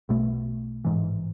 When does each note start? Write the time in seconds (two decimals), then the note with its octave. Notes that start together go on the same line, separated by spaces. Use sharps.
0.09 B1 B2 A3
0.85 A1 G#2 E3